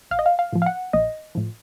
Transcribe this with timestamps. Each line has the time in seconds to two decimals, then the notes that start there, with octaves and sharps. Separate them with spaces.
0.11 A#1 F5
0.19 D#5
0.26 F5
0.39 F5
0.53 A2 F3
0.62 F5
0.66 F#5
0.93 A#1 D#5
1.35 A2 F3